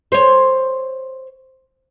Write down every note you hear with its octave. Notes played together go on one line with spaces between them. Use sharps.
C5 C#5